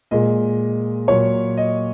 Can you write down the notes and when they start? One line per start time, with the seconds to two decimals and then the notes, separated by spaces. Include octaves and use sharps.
0.11 A#2 G#3 D#5
1.08 A#2 F#3 C#5
1.57 D#5